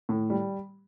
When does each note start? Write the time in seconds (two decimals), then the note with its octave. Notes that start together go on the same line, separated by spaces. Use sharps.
0.09 A2
0.30 G3